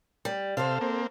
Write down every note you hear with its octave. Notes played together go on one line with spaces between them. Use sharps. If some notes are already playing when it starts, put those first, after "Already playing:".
G3
C3 A4 C5 F5
A#3 C4